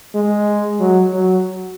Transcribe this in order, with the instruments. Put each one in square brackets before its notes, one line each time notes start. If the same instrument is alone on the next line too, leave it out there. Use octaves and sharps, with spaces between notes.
[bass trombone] G#3
F#3
F#3